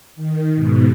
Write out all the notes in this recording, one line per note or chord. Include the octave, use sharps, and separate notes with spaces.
D#3
G#2 B2